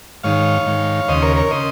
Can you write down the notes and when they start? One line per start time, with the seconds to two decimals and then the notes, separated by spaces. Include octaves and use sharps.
0.23 G#2 D#3 C#5 F5
0.66 G#2 D#3
1.08 D#2 C#3 C5 D#5
1.22 A#4 C#5
1.36 A#4 C#5
1.51 C#3 C5 D#5